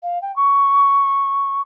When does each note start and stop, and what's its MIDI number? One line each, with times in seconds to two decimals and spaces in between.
0.03 0.21 77
0.22 0.34 79
0.36 1.61 85